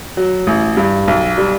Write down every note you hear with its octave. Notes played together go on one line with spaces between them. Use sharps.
F#3
A1
G2
B1
G3